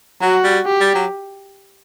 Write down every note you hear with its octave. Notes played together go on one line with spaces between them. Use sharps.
F#3 F#4
G3
G4
G3
F#3